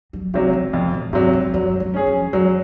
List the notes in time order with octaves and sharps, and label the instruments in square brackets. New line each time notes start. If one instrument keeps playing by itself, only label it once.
[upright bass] F#3
[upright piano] C3 F#3 [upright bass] D#3
[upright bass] C#3
[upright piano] F2 [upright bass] C3
[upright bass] A#2
[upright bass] G#2 [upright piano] C3 F#3
[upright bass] F#2
[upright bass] F#2 [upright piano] F#3
[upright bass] F#2
[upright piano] C#4 G#4
[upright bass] F2
[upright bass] F#2 [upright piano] F#3